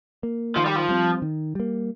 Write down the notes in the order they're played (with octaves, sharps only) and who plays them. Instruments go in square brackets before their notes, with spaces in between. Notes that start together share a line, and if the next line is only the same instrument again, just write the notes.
[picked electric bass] A#3
[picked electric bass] D#3 [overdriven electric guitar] F3
[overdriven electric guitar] G3
F3
[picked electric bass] G3 C4
D#3
G3 A#3